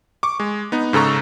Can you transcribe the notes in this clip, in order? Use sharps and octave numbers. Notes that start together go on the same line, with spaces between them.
C#6 D6
G#3
B3 D#4
G#2 C#3 A4 A#5 C#6